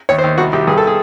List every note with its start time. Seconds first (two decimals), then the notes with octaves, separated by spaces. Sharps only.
0.09 D#2 C#5
0.18 C5
0.23 D#2
0.38 C2 F#4
0.53 C2 G4
0.67 G2 G#4
0.78 A4
0.87 G#4